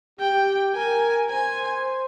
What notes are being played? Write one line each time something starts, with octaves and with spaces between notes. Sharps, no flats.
G4 G5
A#4 G#5
C5 G#5